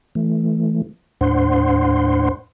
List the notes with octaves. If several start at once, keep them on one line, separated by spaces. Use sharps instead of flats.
E3 A3
D#2 A2 D4 C5 F#5 C6